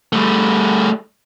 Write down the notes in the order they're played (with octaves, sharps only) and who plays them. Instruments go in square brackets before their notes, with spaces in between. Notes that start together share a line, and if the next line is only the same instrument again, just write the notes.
[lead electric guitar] G3 A3